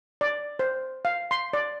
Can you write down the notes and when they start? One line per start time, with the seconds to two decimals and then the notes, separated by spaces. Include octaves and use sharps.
0.21 D5
0.59 C5
1.05 F5
1.31 C6
1.53 D5